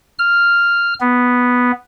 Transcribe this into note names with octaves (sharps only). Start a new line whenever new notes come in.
F6
B3